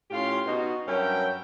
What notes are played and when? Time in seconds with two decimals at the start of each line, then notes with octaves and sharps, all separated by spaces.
0.11 A2 C#4 F4 G4 F5 C6
0.46 B2 D#4 F#4
0.86 G2 F#3 C#4 A#4 E5 G5